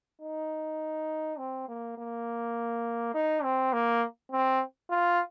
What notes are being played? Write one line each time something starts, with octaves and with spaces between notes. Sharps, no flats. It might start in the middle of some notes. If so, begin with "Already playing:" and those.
D#4
C4
A#3
A#3
D#4
C4
A#3
C4
F4